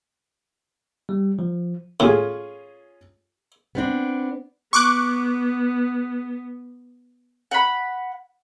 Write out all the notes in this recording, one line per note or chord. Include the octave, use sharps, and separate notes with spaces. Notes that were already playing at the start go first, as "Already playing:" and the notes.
G3
F3
A2 C#4 F4 G#4
B3 C4 D4
B3 C#6 D6 F#6
F#5 B5